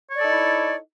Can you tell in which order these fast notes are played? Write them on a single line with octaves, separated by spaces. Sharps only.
C#5 D5 A4 D#4 E4